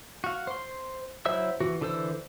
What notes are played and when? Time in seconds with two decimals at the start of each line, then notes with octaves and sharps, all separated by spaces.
0.24 F#4 F5
0.47 C5 C6
1.26 F#3 E4 C5 E5 E6
1.60 E3 F#4
1.81 D3 E3 A4 C5 E6